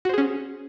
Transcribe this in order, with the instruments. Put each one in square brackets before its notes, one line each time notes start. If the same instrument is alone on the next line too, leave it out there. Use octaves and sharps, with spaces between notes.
[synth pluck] F#4
C5
G#4
C#4